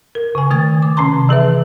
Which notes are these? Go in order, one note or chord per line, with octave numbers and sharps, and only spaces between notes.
A#4
C#3 G#5
D#3 A3 G#6 A6
D6
C3 C#4 A5 A#5 C6
E3 G#4 B4 E5